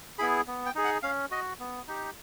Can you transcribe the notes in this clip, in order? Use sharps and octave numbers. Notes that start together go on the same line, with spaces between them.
B3 E4 G#4 B5
B3
G5
D#4 G#4
F#5
C#4 F5
F#4 D#5
B3
D#4 G4